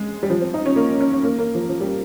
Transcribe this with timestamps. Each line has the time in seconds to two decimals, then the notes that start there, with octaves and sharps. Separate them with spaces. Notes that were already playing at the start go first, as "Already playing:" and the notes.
Already playing: G#3
0.23 G3
0.30 F3
0.41 C4
0.54 D#4
0.66 C#4
0.76 A#3
1.00 C#4
1.12 C#4
1.23 A#3
1.38 A#3
1.55 F3
1.69 F3
1.81 G3